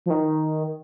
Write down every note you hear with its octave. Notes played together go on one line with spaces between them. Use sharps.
F3
D#3